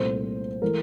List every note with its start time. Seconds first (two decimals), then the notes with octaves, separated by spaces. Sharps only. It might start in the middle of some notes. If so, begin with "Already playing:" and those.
Already playing: C2 A#2 A3 C5
0.62 E3 A3 A#4